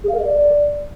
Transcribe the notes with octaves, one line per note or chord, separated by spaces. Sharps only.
G#4
F5
A#4
D#5
D5